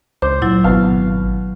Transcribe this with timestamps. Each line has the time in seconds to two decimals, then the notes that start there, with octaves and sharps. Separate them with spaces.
0.22 C#2 C5 D6
0.42 A#2 F#3 E4
0.64 G#1 B2 F5